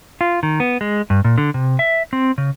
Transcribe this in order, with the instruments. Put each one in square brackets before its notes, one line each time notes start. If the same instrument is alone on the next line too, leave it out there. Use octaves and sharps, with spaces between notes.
[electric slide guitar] F4
D#3
B3
G#3
G2
A#2
D3
C3
E5
C4
C#3